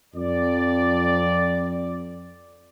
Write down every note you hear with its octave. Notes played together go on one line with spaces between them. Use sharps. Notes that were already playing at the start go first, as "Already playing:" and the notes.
F2 D5